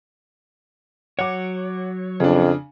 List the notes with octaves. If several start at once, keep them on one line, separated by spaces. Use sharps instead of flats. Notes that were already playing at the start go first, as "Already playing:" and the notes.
F#3 C#5 F#5 D6
F2 C#3 D4